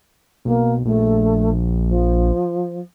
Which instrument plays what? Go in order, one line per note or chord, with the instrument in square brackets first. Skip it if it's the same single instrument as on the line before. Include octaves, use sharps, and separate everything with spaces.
[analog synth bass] B1 [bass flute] A#3
[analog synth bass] A#1 [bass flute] A3
[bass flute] F3